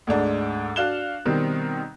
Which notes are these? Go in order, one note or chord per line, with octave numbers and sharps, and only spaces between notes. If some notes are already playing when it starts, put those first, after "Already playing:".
D2 G#2 D4
D4 F#4 F5 F#6 E7 G7
B2 D#3 G3 C4